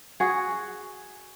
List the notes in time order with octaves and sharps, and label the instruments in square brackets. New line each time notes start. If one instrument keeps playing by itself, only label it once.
[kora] F#4 G#4